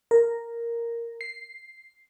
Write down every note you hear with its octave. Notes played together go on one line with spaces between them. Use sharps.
A#4
C7